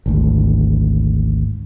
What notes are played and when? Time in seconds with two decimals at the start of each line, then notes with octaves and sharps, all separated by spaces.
0.06 G#1 D2